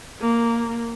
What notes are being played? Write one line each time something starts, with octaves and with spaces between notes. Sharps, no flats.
A#3